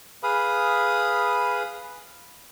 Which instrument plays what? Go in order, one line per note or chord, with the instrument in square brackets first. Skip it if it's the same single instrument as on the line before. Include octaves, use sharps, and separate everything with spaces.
[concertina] G#4 B4 F5 B5 D#6